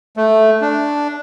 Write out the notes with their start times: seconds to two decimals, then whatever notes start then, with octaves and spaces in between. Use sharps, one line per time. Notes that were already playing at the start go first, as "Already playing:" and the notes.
0.17 A3
0.61 D4